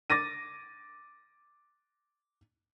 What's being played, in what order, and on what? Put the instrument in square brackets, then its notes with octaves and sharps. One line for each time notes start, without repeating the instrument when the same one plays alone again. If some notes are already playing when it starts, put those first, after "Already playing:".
[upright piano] D6 A6 A#6 D#7